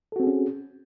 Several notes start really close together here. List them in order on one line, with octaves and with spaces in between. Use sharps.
A4 F#4 C4 G#4 C#4